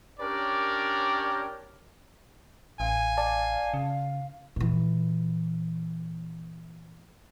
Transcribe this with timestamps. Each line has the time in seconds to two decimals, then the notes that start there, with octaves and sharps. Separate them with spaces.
0.20 C#4 D4 G4 A#4 C#5 D5
2.80 A1 F5 G#5
3.17 D5 A5
3.74 C#3
4.56 A#2 E3